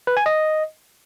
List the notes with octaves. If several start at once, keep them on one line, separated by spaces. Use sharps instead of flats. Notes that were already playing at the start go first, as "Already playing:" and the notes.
B4
G#5
D#5